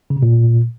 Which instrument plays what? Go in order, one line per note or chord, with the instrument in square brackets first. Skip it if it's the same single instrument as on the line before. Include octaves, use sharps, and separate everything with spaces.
[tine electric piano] C#3
C3
A#2